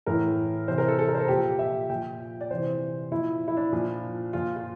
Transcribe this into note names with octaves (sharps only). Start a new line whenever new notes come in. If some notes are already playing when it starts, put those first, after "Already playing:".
A2 E3 A#4
C3 E3 C5
A#4
A4
A4
A#4
C5
A#4
A#2 F3 G4
E5
A#2 F3 G5
D5
C3 E3 C5
A#2 F3 E4
E4
D4
A#2 F3
A#2 F3 F4
F4